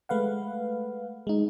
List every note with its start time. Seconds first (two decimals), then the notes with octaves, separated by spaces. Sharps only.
0.09 G#3 A3 B4 F5 F#5
1.27 G#3 D#4